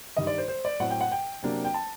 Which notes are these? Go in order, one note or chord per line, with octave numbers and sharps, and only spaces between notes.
G2 D#3 G3 D#5
D5
C5
C5
D5
A2 F#3 A3 C4 F#5
G5
F#5
G5
C3 F#3 A#3 D4
G5
A5